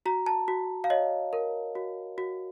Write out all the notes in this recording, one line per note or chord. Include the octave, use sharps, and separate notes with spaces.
F#4 A#5
A5
F#4
F5
C#5 D#5
A#4
F#4
F#4